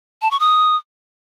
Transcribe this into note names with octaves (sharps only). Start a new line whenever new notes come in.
A5
C#6
D#6